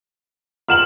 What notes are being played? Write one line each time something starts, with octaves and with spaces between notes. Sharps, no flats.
F4 A#4 F#5 F6 E7 F#7